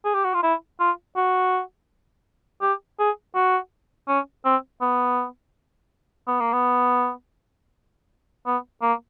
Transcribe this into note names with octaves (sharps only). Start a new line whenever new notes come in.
G#4
G4
F#4
F4
E4
F4
F#4
G4
G#4
F#4
C#4
C4
B3
B3
A#3
B3
B3
A#3